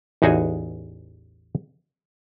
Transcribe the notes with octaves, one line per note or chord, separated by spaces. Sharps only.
A1 E2 D#4 F#4 G#4 G#5